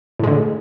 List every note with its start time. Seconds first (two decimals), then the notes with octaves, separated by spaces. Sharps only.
0.19 A2
0.23 G#3
0.27 D3